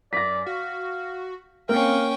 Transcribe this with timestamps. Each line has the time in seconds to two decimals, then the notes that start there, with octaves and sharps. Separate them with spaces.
0.13 F#2 D5 A#6 B6
0.46 F#4 F5
1.69 A#3 C4 C#4 F5 G5